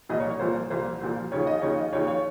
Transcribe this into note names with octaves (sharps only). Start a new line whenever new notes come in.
C2 A#2 F3 D#5
C#5
C#5
C2 A#2 F3 C5
C2 A#2 F3 C5
C2 A#2 F3
D#2 C#3 F3 C#5
D#5
D#2 C#3 F3 C#5
D#5
D#2 C#3 F3 C#5
C#5